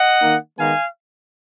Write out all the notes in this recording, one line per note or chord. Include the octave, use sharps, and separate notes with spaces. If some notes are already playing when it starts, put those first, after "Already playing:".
Already playing: D#5 F#5
D#3 A#3 D#4
D#3 G#3 B3 D#4 F5 G#5